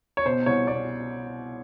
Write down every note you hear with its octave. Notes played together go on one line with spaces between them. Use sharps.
C#5
B2 C5
C2 C#5
B2 D5